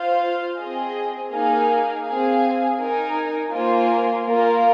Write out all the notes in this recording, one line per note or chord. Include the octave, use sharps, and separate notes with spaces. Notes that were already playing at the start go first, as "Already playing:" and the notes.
Already playing: F4 C5 F5
C4 G#4 D#5
A#3 D#4 G#4 F5 G#5
C4 G#4 F5 G#5
D#4 A#4 G#5
A#3 F4 C5 G#5
A#3 F4 A#4